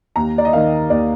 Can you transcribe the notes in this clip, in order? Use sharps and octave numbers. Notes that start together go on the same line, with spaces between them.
D#2 A#5
D5
D#5
D#3 A#3 F5
D#2 D5